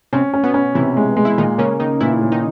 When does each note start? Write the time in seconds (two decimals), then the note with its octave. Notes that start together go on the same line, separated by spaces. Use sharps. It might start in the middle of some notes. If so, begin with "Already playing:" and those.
0.13 C3 C4 C#4
0.34 C#4
0.44 B2 B3
0.54 C#4
0.75 C3 E3 E4
0.97 G#3
1.17 G#3
1.25 E4
1.38 A#2 D#3 D#4
1.58 C#3 A#3 C#4
1.79 D#3 A#3 D#4
2.00 A#2 E3 E4
2.21 A#2
2.32 D#3 D#4